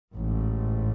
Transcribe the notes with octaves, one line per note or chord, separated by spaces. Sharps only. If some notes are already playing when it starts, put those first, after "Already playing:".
A1 G#2